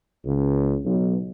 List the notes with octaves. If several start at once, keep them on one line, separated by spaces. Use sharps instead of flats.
C#2
B1